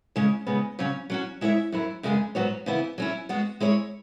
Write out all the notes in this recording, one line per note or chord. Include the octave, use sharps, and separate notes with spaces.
C#3 G#3 C#4
C#3 G#3 B3
C#3 F#3 C#4
F#3 C#4 F#4
G#3 E4 C#5 E5
F#2 F#3 E4
F#2 C#3 G#3 B3 G#4
G#2 F#3 B3 F#4 C#5
C#3 E3 B3 E4
F#3 C#4 E4
G#3 B3 F#4
G#3 E4 C#5